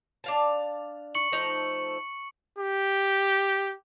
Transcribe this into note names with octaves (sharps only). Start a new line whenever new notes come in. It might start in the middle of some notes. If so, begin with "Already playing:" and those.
D4 F5 A5
C#6 C#7 F#7
F3 A3 D#4
G4